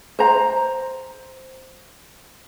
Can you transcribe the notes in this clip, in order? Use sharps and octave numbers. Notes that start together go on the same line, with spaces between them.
C5 A#5